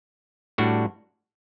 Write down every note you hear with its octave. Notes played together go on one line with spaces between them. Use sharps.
A2 G3 D4 F#4